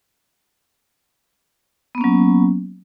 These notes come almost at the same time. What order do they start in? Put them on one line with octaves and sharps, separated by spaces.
B3 A#3 C#4 F#3